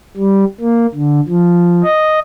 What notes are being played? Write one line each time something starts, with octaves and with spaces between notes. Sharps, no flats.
G3
A#3
D3
F3
D#5